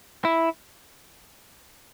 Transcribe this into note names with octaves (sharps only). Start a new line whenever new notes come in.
E4